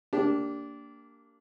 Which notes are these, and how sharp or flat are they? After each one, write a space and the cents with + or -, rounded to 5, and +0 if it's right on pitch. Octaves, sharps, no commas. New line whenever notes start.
A#3 -25 D4 -20 G4 +0